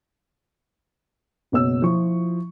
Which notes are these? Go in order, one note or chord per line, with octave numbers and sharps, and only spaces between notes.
F#1 B2 C#5 E6
F3 E4 F4 C#6